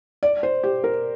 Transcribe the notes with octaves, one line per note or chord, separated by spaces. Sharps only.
D5
C5
G4
A#4